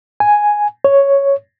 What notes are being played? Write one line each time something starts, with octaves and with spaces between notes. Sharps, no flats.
G#5
C#5